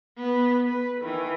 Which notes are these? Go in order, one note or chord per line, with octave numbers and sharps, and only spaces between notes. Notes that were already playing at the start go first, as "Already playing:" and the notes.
B3
B4
D#3 E3